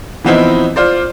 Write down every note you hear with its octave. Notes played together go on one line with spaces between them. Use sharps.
E3 F3 B3 C4 D#4 E4
F4 C5 D5